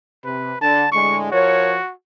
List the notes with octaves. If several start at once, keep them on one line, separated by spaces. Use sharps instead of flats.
C3 B4
D3 A5
A2 D3 G#3 C#6
F3 F#4 A#4 C#5